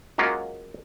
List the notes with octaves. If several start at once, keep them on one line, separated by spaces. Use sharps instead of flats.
F#3 G#3 A#3 C#4 F4